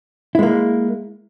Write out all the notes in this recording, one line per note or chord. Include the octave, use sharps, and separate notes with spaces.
G#3 A#3 E4